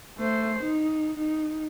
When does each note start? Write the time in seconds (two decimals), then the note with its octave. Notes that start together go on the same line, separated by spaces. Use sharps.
0.18 A3 C5
0.63 D#4
1.17 D#4